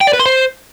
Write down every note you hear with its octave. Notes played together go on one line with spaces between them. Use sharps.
G5
D5
B4
C6
C5